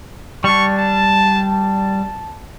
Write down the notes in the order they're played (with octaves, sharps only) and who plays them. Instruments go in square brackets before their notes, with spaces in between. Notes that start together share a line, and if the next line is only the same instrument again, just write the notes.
[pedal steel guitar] G3 D4 [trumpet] C#6
[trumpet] A5
A5